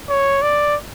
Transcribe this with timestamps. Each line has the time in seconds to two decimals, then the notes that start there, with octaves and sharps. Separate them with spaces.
0.10 C#5
0.42 D5